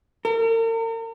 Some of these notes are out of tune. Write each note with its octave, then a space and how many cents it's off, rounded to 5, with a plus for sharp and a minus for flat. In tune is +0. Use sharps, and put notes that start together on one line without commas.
A#4 -40